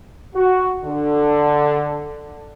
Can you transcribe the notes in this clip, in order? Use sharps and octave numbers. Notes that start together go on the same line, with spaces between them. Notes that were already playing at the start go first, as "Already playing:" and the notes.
F#4
D3